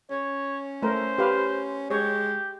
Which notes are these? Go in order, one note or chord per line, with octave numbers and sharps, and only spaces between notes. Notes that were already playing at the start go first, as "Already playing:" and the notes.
C#4 C#5
A3 A#4 C5
G4 B4 F5
G#3 G4 C#5